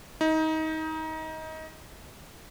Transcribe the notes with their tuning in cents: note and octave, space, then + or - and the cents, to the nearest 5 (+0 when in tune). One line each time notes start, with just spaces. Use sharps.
D#4 +25